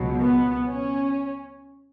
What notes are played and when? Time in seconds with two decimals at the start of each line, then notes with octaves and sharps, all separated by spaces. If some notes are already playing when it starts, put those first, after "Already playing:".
Already playing: C#2 B2 F#3
0.23 B3
0.68 C#4